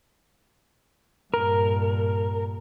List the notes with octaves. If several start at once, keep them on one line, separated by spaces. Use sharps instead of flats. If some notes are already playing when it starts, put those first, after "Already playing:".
G2 A#2 A#4